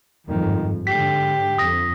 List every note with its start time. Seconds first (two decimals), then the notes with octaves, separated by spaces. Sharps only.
0.27 G1 F2 G#2 D#3
0.87 G#2 D3 G4 B6 C7
1.58 F2 D#6 A#6